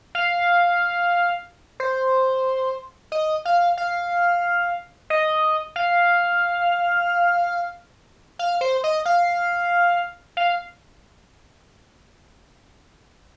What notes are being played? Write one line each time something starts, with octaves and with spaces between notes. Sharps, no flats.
F5
C5
D#5
F5
F5
D#5
F5
F5
C5
D#5
F5
F5